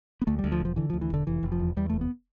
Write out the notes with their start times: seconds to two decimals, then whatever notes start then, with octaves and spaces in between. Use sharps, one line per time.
0.22 B3
0.27 D2 A3
0.39 G3
0.44 D2
0.52 F3
0.60 E1
0.65 F3
0.76 D3 E3
0.90 D2 F3
1.01 E3
1.11 E1 D3
1.27 F1 E3
1.43 F1
1.52 F3
1.59 E2
1.77 E2 G3
1.90 A3
1.93 F1
2.01 B3